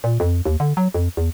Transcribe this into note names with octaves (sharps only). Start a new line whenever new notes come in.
A#2
F2
D#2
D3
F#3
F2
E2